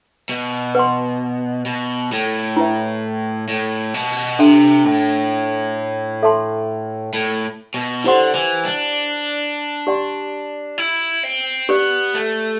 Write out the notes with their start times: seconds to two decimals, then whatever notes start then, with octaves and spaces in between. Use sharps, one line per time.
0.29 B2
0.75 B4 F#5 C6
1.66 B2
2.12 A2
2.57 E4 B4 E5
3.48 A2
3.94 B2
4.39 C3 D4 A4 E5 G5 C6
4.85 A2
6.23 A4 E5 A5 C6
7.13 A2
7.74 B2
8.04 D3 E4 G4 C5 F#5 C6
8.35 E3
8.65 D4
9.87 G4 D5 G5 C6
10.78 E4
11.23 C4
11.69 B3 G4 B4 D5
12.15 A3